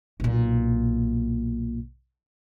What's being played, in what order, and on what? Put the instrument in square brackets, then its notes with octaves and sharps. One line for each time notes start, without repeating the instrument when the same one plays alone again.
[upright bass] B1 A#2